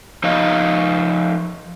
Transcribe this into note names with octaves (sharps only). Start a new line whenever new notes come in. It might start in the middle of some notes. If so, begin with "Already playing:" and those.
F3 D#4 D#5 F5